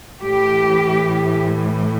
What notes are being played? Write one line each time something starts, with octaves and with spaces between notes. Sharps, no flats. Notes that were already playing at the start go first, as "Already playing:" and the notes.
A2 E3 G4